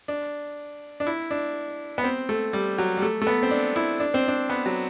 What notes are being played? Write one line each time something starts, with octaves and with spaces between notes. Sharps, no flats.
D4
D4
E4
D4
B3
C4
A3
G3
F#3
G3
A3
A3
B3
C4
D4
E4
D4
C4
D4
B3
F#3